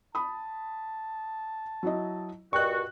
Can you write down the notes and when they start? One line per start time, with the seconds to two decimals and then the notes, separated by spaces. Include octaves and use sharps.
0.15 A5 B5 D#6
1.83 F#3 E4 D#5
2.53 G2 A#2 F#4 D#5 G5 C#6 F#6